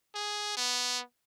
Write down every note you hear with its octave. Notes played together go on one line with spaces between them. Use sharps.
G#4
B3